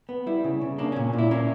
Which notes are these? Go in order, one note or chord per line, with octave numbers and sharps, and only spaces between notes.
B3
G3 E4
C#3
C#3
A#3 D4
C#4
A#2
A#2
E4
A#3 C#4